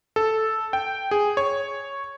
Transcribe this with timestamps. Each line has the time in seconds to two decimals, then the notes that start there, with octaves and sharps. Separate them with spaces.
0.16 A4
0.73 G5
1.11 G#4
1.37 C#5